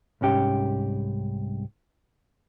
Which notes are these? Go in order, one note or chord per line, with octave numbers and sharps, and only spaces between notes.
C2 G#2 C#4 G4